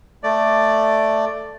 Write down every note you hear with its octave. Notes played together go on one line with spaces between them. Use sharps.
A3 D5